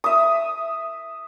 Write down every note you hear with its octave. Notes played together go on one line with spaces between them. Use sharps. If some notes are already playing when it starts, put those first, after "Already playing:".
E5 D#6